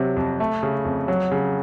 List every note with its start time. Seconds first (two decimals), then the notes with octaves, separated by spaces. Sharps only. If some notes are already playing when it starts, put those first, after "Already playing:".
Already playing: C3 F#3
0.16 F2
0.40 A3
0.63 C#3
0.85 F2
1.08 F#3
1.32 C#3